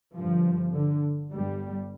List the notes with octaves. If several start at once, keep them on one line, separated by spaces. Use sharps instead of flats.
G1 G2 F3
D3
G1 G2 G3